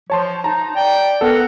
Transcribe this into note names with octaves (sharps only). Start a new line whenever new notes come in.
F3 C#5 A5 C6
D#4 A5 A#5
D5 G5
B3 A4 A#4 F#5